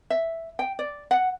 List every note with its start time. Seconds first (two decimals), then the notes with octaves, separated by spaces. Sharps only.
0.10 E5
0.59 G5
0.79 D5
1.11 F#5